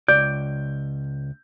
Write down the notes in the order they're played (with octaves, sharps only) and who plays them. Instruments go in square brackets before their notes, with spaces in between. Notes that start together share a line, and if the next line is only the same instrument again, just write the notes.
[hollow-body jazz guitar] C#2 D5 [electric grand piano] G6